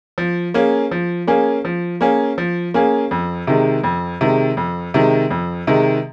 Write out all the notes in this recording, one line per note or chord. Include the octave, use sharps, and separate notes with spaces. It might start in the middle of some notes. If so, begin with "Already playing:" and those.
F3
A#3 C#4 G#4
F3
A#3 C#4 G#4
F3
A#3 C#4 G#4
F3
A#3 C#4 G#4
F2
C3 D#3 G#3
F2
C3 D#3 G#3
F2
C3 D#3 G#3
F2
C3 D#3 G#3